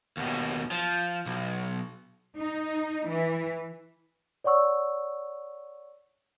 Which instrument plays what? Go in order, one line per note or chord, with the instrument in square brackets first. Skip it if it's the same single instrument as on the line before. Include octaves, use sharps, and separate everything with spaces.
[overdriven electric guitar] D#2 B2
F3
B1
[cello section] D#4
E3
[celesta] C#5 D5 F#5 C#6 E6